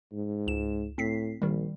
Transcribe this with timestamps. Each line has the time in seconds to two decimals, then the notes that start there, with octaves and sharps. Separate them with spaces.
0.12 G#2
0.47 C#2 E7
0.98 A2 C4 B6 C7
1.42 A#1 D#3 G3